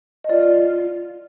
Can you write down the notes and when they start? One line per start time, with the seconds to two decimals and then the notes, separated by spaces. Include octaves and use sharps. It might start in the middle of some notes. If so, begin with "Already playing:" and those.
0.24 D#5
0.29 F4 D5